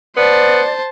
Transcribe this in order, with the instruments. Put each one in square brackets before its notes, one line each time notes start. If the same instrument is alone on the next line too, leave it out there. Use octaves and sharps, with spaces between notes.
[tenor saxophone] B3 [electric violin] C5 A5 [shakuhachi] D5